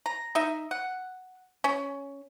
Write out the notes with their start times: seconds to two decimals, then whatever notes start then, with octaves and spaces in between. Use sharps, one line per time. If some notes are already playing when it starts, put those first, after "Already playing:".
0.06 A#5
0.35 D#4 D#5 E5
0.71 F#5
1.64 C#4